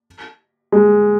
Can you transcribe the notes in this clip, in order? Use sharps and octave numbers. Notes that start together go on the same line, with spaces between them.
G#3